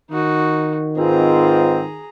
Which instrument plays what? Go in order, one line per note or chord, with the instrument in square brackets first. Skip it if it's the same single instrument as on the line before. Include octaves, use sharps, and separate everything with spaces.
[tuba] D#3 [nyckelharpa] D#4 F#4
[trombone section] G#2 C4 [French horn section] F4 B4 [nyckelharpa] G#4 A#5